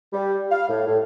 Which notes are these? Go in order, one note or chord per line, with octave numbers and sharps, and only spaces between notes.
G3
F5
A2
A2